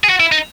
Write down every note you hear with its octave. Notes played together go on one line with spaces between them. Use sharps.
G#4
F#4
E4
D#4